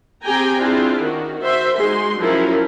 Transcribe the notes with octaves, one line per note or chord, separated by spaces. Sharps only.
C4 G4 G#4 G5 G#5 A#5
C4 D4 E4 F4 G#4
D#3 F#4
F#4 C5 E5
G#3 D#4 F#4 G#4 C6
F3 F#3 C#4 E4 A#4